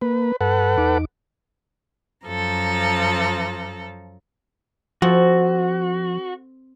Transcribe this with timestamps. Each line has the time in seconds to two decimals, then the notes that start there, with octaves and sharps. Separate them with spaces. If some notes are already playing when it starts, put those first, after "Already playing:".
0.02 A#3 B4
0.41 G2 A4 B4 F#5
0.77 E2 D#4 D6
2.26 F#2 F3 A4 A#5
5.02 F3 C4 F#4 A4